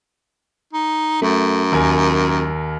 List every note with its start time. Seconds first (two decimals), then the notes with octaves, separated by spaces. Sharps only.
0.73 D#4
1.22 F#2 A3
1.72 D#2 A#4 G#5